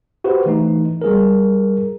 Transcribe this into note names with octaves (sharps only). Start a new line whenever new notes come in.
F#4 G4 B4 C5
E3 A3 D#4
G3 G#4 A#4